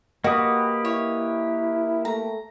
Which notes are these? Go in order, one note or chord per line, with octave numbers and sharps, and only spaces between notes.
A#3 F#4 G4 B4 D#5 D#6
E4 C#5
A3 A#5